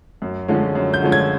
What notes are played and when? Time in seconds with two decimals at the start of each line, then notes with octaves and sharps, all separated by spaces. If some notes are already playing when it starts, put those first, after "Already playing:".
0.22 F#2
0.48 D3 F3 G#3 C#4
0.75 F#2
0.94 G6
1.02 D3 F3 G#3 C#4
1.12 G#6